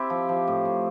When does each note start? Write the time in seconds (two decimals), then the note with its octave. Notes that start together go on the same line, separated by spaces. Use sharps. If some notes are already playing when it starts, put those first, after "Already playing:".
Already playing: C4 E4 G4
0.10 F3
0.29 F3
0.47 A2
0.65 A2